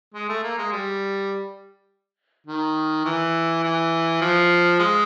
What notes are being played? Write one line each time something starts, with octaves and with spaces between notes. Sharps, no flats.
G#3
A3
A#3
G#3
G3
D#3
E3
E3
F3
G#3